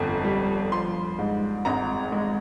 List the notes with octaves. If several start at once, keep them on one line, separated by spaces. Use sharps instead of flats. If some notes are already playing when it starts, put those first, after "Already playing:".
Already playing: G1 F2
G3
F3 C6
G#2
G#1 A#5
G#3